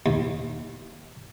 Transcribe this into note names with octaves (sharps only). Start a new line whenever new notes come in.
D#2